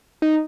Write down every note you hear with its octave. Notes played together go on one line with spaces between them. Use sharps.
D#4